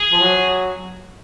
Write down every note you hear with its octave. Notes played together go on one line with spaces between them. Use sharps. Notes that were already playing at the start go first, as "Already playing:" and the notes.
Already playing: G#4
F3
F#3